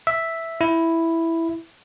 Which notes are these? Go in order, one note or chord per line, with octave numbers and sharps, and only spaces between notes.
E5
E4